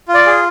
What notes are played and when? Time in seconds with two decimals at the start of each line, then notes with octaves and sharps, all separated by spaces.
0.08 F4
0.14 D5
0.26 G#4